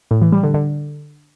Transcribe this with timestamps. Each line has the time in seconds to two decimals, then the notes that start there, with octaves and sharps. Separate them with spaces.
0.11 A2
0.22 E3
0.32 G3
0.43 D3
0.54 D3